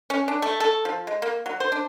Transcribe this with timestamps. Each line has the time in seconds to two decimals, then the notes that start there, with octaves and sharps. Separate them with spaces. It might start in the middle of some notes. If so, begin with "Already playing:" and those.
0.10 C#4
0.28 D4
0.42 A3
0.60 A4
0.85 F3
1.07 G#3
1.22 A#3
1.46 F#3
1.60 C5
1.72 D4